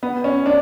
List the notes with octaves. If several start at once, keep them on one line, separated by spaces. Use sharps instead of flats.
B3
C#4
D4